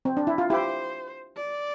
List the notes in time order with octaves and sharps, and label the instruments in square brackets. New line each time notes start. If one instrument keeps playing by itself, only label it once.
[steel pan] C4
D4
E4
F4
[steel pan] E4 G4 [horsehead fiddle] C5
[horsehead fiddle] D5